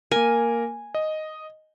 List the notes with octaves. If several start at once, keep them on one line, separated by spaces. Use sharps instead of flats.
A#3 A#4 G#5
D#5